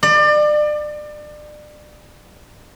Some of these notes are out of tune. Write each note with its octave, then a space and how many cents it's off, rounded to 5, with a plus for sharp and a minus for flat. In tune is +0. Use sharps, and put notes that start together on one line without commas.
D5 +30